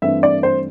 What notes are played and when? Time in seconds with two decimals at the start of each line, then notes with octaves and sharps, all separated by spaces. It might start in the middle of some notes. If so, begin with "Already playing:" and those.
0.02 G2 E3 A3 C4 E5
0.23 D5
0.43 C5